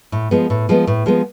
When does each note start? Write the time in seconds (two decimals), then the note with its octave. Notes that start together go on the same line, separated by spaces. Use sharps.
0.12 A2
0.31 F3 G#3 B3
0.50 A2
0.69 F3 G#3 B3
0.87 A2
1.06 F3 G#3 B3